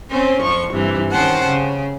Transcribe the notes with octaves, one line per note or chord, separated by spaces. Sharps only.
C4 C#4 C5
F2 F3 C#6
G2 C3 E3
D#3 C#4 C5 F#5 G5 A5
C#3